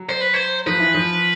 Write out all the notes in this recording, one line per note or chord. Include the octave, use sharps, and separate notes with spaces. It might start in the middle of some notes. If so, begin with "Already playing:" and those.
Already playing: F#3
C5
B4
C5
F3 B4
E3
F3